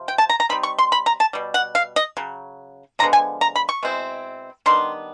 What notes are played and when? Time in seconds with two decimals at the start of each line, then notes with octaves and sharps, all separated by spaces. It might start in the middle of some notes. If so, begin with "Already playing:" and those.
Already playing: C3 F3
0.08 G5
0.18 A5
0.30 A#5
0.40 A#5
0.49 G3 C4 D#4 B5
0.63 C#6
0.78 C6
0.92 B5
1.06 A#5
1.20 A5
1.33 B2 G3
1.54 F#5
1.75 F5
1.96 D#5
2.17 C#3 F#3
2.99 D3 F3 G#3 B3 A#5
3.13 G#5
3.41 A#5
3.56 B5
3.69 C#6
3.83 B2 G#3 C4 E4
4.66 D#3 G3 B3 D4 C6